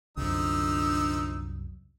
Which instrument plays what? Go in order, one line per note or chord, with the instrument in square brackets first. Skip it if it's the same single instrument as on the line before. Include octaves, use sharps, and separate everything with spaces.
[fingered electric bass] C2 F#2 [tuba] D3 [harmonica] F3 D#4 E6